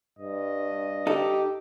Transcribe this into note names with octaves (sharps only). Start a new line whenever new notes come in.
G2 D#5
D#4 G4 A4